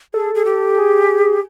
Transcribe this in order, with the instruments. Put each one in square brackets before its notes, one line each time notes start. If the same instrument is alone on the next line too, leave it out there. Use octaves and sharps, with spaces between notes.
[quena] G#4 [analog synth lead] A4
[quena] G#4
G4
[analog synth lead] G#4